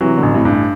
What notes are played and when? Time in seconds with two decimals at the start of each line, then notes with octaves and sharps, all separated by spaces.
0.01 C3 E3 F#3
0.17 B2 D3
0.23 A1
0.34 A2 C3
0.45 G2
0.51 A2